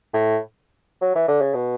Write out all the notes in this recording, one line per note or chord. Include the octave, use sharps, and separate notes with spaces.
A2
F#3
E3
D3
C#3
B2